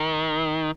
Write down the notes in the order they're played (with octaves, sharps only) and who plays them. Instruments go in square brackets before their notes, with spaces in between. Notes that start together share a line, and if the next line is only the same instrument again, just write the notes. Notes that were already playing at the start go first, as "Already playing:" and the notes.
Already playing: [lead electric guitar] D#3